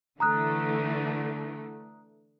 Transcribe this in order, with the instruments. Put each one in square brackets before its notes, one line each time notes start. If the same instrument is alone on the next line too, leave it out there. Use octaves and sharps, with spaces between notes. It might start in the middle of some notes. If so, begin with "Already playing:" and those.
[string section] D3 E3 A3 [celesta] A#5 D#6 F#6